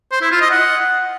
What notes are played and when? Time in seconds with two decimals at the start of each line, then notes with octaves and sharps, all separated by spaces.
0.12 C5
0.21 E4
0.31 F4
0.41 D#5
0.51 F#5